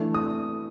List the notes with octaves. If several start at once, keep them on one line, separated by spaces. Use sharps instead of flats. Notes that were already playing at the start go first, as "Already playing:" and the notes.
Already playing: E3 A3 D4
D#6